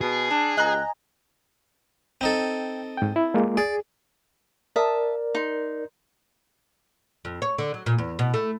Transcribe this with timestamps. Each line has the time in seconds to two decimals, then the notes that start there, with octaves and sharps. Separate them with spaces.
0.01 B2 G#4
0.31 C#4 D4
0.57 C#2 D#5 G5 G#5 A#5 F#6
2.21 C4 D#4 A4 G5
2.97 G#2 G5
3.16 E4
3.34 G#3 A#3 F4
3.57 G#4 D5
4.76 A#4 D5 E5 A5 D#6
5.35 D#4 C6
7.25 F2
7.42 C#5
7.58 D3
7.74 F#3
7.86 A#2
7.98 E2
8.19 B2
8.34 A3